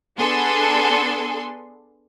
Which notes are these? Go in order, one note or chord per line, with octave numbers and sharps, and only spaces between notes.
B3 D4 G#4 A4 C6